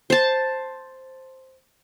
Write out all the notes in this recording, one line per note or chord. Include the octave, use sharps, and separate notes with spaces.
C5 A5